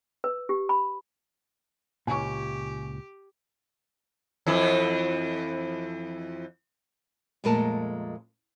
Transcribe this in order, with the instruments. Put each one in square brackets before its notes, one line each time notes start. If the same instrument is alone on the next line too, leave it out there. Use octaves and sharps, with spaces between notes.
[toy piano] B4
G4
B5
[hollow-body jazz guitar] C#2 A#2 [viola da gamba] G4 [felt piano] G#5 C#6
[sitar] F2 E3 E4
[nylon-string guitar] F2 A#2 G#3 A3 A#4 A5